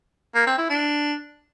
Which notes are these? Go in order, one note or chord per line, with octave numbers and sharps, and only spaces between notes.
A#3
C4
E4
D4